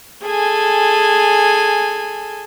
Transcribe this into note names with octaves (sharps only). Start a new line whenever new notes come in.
G#4 A4 G#5